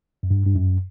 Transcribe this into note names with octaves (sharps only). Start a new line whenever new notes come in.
F#2
G2
G2
F#2